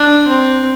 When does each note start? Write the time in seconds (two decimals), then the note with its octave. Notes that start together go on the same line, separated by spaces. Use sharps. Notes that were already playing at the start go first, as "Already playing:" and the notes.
Already playing: D4
0.28 C4